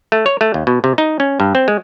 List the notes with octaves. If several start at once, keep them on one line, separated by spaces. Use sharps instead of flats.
A3
C#5
A3
D#2
B2
C3
D#4
C#4
G2
C4
G#3